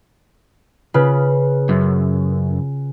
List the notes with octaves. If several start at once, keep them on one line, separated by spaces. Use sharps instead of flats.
C#3 F4 B4
F#2